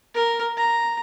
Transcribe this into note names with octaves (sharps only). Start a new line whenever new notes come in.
A#4
A#5